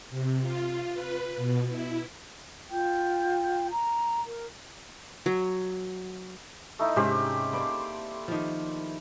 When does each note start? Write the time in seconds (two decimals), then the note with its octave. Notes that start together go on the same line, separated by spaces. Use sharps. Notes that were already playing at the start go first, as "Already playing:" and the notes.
0.10 C3
0.41 F4
0.94 B4
1.36 B2
1.69 E4
2.71 F4 G5 G6
3.70 A#5
4.25 A#4
5.26 F#3
6.79 A3 D#4 E4
6.96 G#2 C3 C4 C#4 G4 C5
7.53 A#3 C5 D5 B5
8.28 D#3 F3